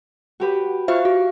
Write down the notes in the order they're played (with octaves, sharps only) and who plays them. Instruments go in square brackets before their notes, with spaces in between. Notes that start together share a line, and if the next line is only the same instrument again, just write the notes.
[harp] F#4 G4 B4
[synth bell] F4 C5 E5 [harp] F5 C#6 F#6
[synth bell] F#4